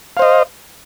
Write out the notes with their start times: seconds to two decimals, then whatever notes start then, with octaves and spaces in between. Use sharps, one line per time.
0.17 F5
0.19 C5
0.22 D#5